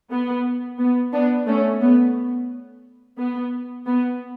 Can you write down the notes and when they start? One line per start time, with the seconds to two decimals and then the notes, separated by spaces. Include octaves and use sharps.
0.11 B3
0.79 B3
1.12 B3 D4
1.47 A3 C#4
1.82 B3
3.18 B3
3.86 B3